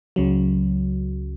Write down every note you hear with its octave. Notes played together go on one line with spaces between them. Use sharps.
C#2 C#3 F#3